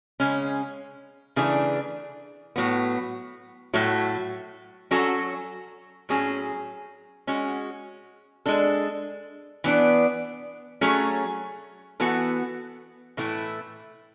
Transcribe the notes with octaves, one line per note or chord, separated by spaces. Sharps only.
C#3 G#3 C#4
C#3 E3 A3 D4 G#4
A2 F#3 B3
A2 F#3 A3
F#3 C#4 F#4 A4
A2 F#3 C#4 G#4
G#3 C#4 F#4
G#3 D4 A4
E3 B3 D4
F#3 A3 C#4 G#4
E3 B3 F#4 A4
A2 E3 A3 E4